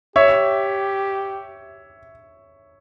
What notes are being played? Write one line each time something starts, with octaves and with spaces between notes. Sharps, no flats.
G4 C#5 E5